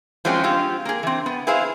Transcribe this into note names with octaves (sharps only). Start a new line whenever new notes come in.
F3 F#3 G#3 C4 C#4
G#3 C4 F4 G4
A#3 G#4
E3 C4
B3
E4 G#4 B4 C5 F5